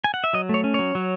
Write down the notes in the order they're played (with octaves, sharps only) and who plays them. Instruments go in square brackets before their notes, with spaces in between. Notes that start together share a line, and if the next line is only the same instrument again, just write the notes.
[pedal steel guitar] G#5
F#5
E5
F#3 D#5
A3 C#5
C#4
F#3 C#5
F#3